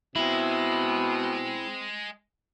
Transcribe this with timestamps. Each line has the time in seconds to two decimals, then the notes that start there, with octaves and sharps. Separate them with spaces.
0.16 B2 G#3 C4 E4